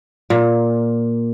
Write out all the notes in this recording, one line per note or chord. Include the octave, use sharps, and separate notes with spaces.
A#2